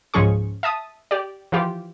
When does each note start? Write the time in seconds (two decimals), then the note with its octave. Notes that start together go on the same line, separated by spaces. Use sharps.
0.14 C#2 G#2 F3 C#4 G#4 C#6
0.63 E5 A5 D#6
1.11 G4 D5
1.52 E3 F3 F4 G4